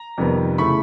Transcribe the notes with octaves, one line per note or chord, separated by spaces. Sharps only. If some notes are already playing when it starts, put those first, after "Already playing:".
Already playing: A#5
F2 C3 D#3 G3 B3
C#3 E3 A3 B5 C#6